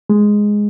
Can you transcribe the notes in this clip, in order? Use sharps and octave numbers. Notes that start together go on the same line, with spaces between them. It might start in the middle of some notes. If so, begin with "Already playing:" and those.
G#3